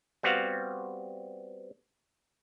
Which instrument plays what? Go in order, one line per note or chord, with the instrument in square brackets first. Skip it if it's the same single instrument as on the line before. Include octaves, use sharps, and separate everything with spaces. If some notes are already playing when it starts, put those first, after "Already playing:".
[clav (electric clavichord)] G3 B3 C4 F#4 F5 F#5